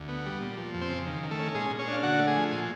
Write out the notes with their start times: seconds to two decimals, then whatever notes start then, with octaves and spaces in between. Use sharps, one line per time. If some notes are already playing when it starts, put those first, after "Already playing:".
Already playing: D2
0.09 B3
0.25 G3
0.41 A#2
0.57 F3
0.74 F2
0.81 C4 C5
0.90 C#3
1.07 D#3
1.23 D#3
1.31 A3 A4
1.39 C#4
1.54 A#2 G#3 G#4
1.71 A#2
1.79 C#4 C#5
1.88 D4
1.93 F5
2.03 D3 F#4 F#5
2.19 A3
2.27 G#4 G#5
2.36 F3
2.52 A#2 G#5